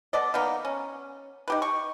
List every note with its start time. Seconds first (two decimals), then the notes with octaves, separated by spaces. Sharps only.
0.13 B3 A4 D5 D#5
0.34 D#3 A#3 B3 D#4
0.65 C#4
1.48 D#4 G4 B4
1.62 C#6